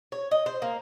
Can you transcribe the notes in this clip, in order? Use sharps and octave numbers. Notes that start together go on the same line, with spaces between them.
C#5
D#5
C5
A#3